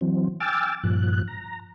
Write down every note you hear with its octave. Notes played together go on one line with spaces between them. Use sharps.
E3 F#3 C4
G5 G#5 D6 E6 F6 A6
G2 A#2 F3 F#6
A#5